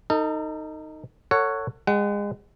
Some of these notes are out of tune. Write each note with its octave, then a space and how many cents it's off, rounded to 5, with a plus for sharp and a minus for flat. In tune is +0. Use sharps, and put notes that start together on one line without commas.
D#4 +0 A4 +40
A4 +35 C#5 +0 F#5 +0
G#3 -30 F#5 +30